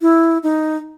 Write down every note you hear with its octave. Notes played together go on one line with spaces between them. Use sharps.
E4
D#4